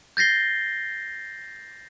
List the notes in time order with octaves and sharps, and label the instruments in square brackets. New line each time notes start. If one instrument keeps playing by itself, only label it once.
[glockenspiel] G6 A6 A#6 C7 G7